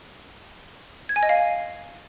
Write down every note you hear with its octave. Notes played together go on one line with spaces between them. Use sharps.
G#6
G#5
D#5
F5